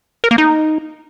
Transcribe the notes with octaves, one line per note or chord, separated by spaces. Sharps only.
A#4
A#3
D#4